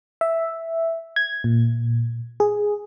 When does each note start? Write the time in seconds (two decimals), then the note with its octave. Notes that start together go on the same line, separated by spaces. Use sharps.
0.21 E5
1.16 G#6
1.44 A#2
2.40 G#4